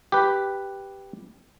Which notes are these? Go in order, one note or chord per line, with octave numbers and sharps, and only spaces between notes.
G4 B4